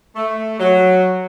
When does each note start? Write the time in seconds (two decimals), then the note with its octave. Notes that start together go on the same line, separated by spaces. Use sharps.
0.16 A3
0.60 F#3